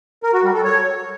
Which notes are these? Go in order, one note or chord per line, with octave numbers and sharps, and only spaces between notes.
A#4
F#4
G3
A4
C#5